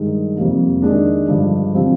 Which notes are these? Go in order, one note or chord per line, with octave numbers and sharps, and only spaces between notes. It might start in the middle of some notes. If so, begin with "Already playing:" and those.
Already playing: G2 D#3 G#3
F2 C3 G3 A#3
D#3 G#3 D4
G2 D3 F3 G#3
C3 F3 C4